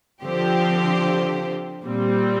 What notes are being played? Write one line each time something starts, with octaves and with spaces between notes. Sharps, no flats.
D3 F3 C4 G4 C5
A#2 G3 C4